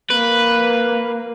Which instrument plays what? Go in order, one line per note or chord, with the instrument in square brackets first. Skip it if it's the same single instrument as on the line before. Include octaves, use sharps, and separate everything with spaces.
[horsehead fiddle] A#3 [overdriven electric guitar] B4